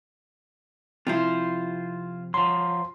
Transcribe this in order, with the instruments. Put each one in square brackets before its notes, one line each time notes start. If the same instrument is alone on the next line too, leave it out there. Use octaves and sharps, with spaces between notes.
[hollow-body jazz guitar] C3 F3 E4 [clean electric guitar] F4 C5
[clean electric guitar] F3 F#3 [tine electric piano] C6